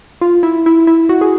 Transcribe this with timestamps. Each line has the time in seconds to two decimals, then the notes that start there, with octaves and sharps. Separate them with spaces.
0.21 F4
0.43 E4
0.66 E4
0.87 E4
1.09 F#4
1.21 G#4